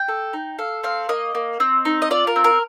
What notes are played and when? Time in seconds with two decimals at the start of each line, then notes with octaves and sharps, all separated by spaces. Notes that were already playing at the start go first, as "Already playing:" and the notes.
Already playing: G5
0.08 A4
0.33 D#4
0.58 A4 F5
0.83 C4 F5
1.09 A#3 D#5
1.35 A#3
1.60 C4
1.85 D#4
2.02 D#5
2.10 F4 D5
2.27 A#4
2.36 C4
2.44 A#4